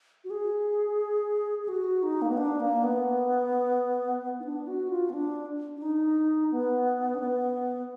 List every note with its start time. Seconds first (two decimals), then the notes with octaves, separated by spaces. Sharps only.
0.24 F#4
0.30 G#4
1.62 G#4
1.68 F#4
2.03 D#4
2.22 A#3
2.29 B3
2.37 D4
2.60 A#3
2.83 B3
4.40 D#4
4.44 D4
4.67 F#4
4.90 F4
5.10 B3
5.14 D4
5.76 D4
5.82 D#4
6.51 B3
7.15 D4
7.20 B3